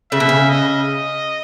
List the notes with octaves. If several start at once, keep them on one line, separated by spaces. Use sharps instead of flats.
C#3 E5
B2
C#3
D#5